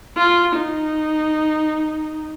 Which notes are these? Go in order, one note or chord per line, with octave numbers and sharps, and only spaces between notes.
F4
D#4